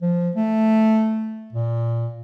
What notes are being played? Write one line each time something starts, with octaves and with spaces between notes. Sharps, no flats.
F3
A3
A#2